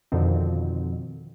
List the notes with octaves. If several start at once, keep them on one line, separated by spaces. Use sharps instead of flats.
F2 B2 D3 D#3 F3 C4